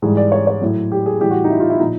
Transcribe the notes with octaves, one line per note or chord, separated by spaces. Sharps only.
G#2 E3 G3 G#4
D5
C#5
C#5
A2 F#3
G4
G#4
A2 E3 G3 G4
F#4
D#4
E4
F4
E4
A#2 F3 D#4